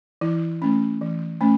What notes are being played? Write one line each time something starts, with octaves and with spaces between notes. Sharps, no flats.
E3 E4
A3 C#4
E3
A3 C#4